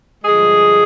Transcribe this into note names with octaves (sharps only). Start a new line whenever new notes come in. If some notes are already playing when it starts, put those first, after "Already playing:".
G2 D3 F3 G#3 G#4